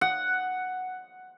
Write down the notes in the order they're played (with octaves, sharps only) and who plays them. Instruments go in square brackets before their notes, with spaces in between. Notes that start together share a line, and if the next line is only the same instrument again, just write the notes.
[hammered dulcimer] F#5